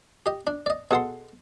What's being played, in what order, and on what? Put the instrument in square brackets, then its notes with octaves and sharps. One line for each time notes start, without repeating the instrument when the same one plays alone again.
[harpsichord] G4 D#5
D4
D5 D#5
[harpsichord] B2 C6 [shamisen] G#4 A4 F#5